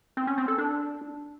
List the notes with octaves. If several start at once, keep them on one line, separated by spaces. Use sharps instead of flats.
C4
C#4
C4
A4
D4